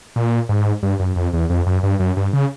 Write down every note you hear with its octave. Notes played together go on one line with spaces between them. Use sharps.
A#2
G#2
G2
F#2
F2
E2
F2
F#2
G2
F#2
G2
C#3